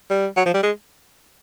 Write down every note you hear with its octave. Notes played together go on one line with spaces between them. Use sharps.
G3
F#3
F3
G3
G#3